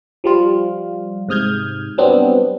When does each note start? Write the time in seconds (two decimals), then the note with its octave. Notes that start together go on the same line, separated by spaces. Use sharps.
0.24 F3 G3 F4
1.29 G#2 C3 D#6 F6 G6 G#6
1.98 F#3 G3 B3 C4 D4